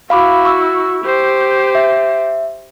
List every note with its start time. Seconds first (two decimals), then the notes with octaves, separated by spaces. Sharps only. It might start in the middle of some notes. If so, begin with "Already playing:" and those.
0.10 E4 F#4 F5 B5 D6
0.45 C#6 E6
1.04 G4 C5
1.75 E5